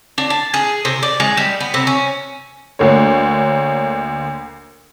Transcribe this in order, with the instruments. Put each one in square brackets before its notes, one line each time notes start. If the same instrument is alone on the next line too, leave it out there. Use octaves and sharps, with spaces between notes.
[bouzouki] D4
A5
G#4
C3
D5
G#3
G3
B3
C3
C#4
[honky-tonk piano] D2 D3 A#3 C#5